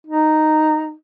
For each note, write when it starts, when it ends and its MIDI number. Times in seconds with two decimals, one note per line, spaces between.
0.07 0.93 63